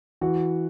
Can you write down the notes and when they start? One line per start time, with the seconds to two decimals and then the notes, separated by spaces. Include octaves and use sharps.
0.21 E3 F#4